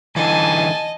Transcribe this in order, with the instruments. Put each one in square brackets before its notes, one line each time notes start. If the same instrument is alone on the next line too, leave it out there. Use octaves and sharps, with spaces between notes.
[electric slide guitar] D3 E3 [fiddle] D#5 [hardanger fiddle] G#5 [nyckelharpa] A5